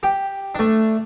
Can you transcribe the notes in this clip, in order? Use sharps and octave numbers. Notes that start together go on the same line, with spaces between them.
G4 G5
A3 D4